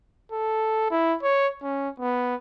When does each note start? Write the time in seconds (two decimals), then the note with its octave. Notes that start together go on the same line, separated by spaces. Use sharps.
0.32 A4
0.91 E4
1.23 C#5
1.63 C#4
2.00 B3